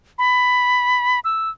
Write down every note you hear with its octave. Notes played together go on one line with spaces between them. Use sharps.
B5
E6